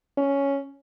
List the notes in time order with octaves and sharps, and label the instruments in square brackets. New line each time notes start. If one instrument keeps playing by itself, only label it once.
[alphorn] C#4